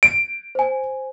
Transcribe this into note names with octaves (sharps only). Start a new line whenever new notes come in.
D7
C5 G#5